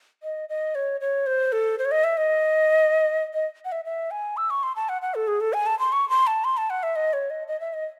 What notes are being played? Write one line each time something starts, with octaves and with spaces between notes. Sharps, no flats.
D#5
D#5
C#5
C#5
C5
A4
C5
C#5
D#5
E5
D#5
D#5
F#5
E5
E5
G#5
E6
C#6
C6
A5
F#5
F#5
A4
G#4
A4
G#5
A5
C6
C#6
C6
A5
C6
A5
F#5
E5
D#5
C#5
D#5
D#5
E5
D#5